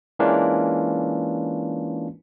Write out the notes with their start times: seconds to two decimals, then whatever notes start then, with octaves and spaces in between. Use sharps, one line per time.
0.19 E3 G#3 A#3 C#4 D4 F4